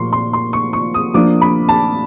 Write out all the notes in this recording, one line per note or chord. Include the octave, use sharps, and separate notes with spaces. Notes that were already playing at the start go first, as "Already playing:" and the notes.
Already playing: A#2 F3 A#3 C6 C#6
C6
C6
C#6
C#6
D#6
F3 A#3 D4 D6
B5
A5